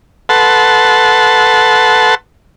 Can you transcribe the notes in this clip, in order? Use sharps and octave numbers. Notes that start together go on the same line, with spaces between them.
A4 B4 F#5 A5 C6